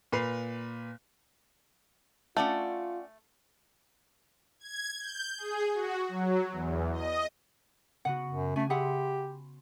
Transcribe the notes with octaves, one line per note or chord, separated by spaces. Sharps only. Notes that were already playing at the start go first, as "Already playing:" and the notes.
A#2 B4 C7 F7
A3 C#4 F4 D5 F#5
G#6
G6
G#4
F#4
F#3
E2
D#5
C#3 B3 F#4 F#5
F#2
A3 C#4 F#4 G#5
G4 G#4 E5 F#5 B5 C6